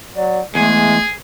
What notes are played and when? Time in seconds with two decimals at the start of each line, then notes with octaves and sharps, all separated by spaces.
0.16 F#3 D5
0.55 E2 G#3 A3 G#4